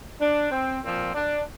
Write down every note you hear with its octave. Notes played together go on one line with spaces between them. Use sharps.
D4
C4
A#2 F3 C4
D4